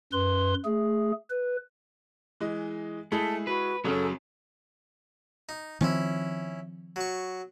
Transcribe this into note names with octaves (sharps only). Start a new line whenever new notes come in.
F#2 B4 C6
A3 G#4
B4
E3 G#3 D#5
G#3 A3 E4 G#4 A5
F#4 B4
F#2 C#3 F#3 C#4 A4
D#4
D#3 F3 C4 C#4 E4
F#3 C#6